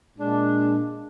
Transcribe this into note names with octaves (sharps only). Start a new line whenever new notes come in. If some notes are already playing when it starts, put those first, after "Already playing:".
A#2 G#3 D4